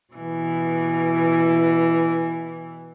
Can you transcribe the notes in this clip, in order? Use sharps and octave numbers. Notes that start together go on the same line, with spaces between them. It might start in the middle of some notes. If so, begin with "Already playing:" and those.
B2 E3